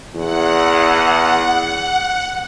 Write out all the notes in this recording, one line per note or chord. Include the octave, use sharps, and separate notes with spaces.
E2 F#5